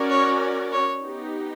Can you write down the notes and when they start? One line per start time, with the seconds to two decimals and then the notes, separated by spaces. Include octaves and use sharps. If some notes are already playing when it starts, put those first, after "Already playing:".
Already playing: C#4 F#4 A#4 D5
0.09 C#5
0.72 C#5
1.03 B3 D#4 G4